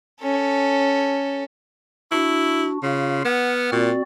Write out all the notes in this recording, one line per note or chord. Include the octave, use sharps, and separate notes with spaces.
C#4 A4
D4 E4 F#4
C#3 F4 F5
B3 F#5 F6
A#2 C4 F#4 D5